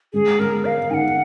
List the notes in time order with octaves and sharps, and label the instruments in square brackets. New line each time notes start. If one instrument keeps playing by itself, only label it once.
[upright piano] G#3 [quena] G#4
[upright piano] G#3 [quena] A#4
[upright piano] A#4 [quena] F5
[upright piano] D#4 [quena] F#5 G#5